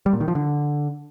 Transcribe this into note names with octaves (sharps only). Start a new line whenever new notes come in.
G3
A#2
D#3
F3
D3